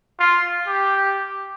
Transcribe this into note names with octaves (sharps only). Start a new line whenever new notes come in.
F4
G4